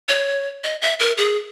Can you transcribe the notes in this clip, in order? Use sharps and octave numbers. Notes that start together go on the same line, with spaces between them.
C#5
D#5
E5
A#4
G#4